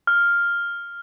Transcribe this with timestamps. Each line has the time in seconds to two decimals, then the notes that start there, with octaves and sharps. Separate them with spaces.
0.07 F6